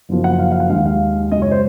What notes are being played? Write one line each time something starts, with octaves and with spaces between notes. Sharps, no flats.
F#1 F#2 F3 A#3
F#5
F5
F5
F#5
D#2 D#3 G#3 F5
F5
F#2 C#3 G#3 D#5
C#5
C5